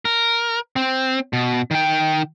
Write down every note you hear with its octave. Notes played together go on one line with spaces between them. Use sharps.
A#4
C4
B2
D#3 G5